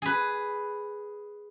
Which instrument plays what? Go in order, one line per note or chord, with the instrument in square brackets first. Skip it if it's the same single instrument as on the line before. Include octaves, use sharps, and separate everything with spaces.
[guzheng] G#4 B4